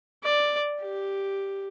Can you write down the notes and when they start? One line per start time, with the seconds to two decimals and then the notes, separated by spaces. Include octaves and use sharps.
0.24 D5
0.80 G4